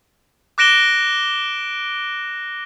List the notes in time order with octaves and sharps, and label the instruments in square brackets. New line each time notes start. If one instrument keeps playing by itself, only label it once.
[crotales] D6 F#6 A#6 D7 E7 G7